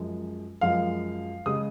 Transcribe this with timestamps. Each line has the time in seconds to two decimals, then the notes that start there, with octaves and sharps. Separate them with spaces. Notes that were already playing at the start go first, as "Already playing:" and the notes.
Already playing: F#2 F3 G#3
0.61 F#2 F3 G#3 F5
1.46 C#3 G#3 D#6